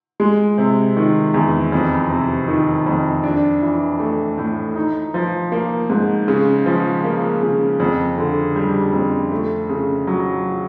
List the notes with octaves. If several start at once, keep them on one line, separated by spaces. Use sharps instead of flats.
G#3
C3
D#3
E2
F2
C3
D#3
F2
D4
E3
A3
A2
D#4
F3
A#3
G#2
C#3
F3
A#3
C#3
F2
D3
G3
F2
A3
C#3
F#3